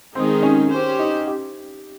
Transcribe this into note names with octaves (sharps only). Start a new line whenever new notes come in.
D#3 G#3 C4 D#4 G#4
C#4
C#4 G4 C5
D#4
G4